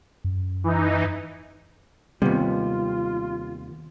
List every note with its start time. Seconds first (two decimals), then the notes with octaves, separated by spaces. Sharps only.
0.24 F#2
0.64 E3 D#4
2.22 D#2 C3 G3 B3 F4